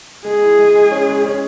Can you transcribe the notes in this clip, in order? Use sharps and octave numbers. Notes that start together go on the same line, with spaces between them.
G#3 G#4
E4
G#3
G#3
C#4
G#3
C#4